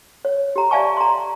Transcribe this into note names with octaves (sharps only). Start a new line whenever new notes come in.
C#5
G4 A#5
D5 E5 F5 G#5 A5 C#6
A#5 C6